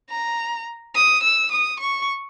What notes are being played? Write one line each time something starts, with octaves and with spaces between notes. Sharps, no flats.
A#5
D#6
E6
D#6
C#6